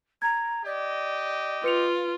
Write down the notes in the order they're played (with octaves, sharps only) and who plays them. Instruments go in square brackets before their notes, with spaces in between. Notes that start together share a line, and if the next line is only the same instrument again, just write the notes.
[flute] A#5 [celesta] G#6
[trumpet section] G4 D#5 [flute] D5
[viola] F4 [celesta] B4 C#7 F7